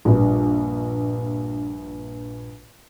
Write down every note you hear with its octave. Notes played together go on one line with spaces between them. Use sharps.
A#1 G2